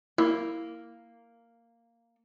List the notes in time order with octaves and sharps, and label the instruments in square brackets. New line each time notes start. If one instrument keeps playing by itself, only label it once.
[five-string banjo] A#3 [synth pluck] E4